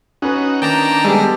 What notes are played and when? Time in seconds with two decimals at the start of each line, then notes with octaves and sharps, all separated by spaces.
0.22 C#4 D#4 F#4 B4
0.62 D#3 A#3 D4 G5 A5 A#5
1.05 G3 G#3 B3 G4 A4